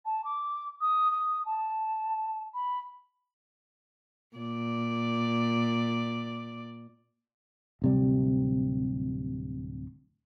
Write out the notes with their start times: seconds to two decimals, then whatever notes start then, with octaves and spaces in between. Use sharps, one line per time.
0.05 A5
0.24 D6
0.81 D#6
1.11 D#6
1.45 A5
2.54 B5
4.37 A#2 D5
7.82 D1 C3 G3